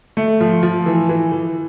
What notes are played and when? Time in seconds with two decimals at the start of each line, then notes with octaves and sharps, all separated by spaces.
0.17 A3
0.40 F3
0.63 F3
0.86 E3
1.09 E3
1.32 E3